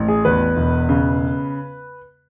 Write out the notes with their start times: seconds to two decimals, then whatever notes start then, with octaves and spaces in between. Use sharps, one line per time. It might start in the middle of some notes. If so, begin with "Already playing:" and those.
Already playing: A1
0.08 G#4
0.25 E2 B4
0.56 E1
0.89 C#3